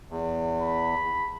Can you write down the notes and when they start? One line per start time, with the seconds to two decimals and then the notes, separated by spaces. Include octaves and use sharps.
0.10 E2
0.62 B5